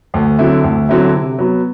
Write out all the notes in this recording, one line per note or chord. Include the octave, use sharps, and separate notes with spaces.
D2
D3 F#3 C4 E4
D2
D3 F#3 C4 E4
C3
F#3 B3